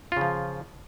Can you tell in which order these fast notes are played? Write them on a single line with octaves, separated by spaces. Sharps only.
F4 C#3 F3